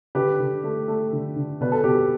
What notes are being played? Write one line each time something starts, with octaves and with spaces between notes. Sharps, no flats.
D3 G4 B4
D3
A3
A3
D3
D3
B2 B4
A4
B2 G4 B4